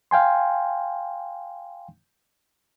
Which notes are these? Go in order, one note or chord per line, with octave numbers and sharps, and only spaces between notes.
F5 G5 G#5 C6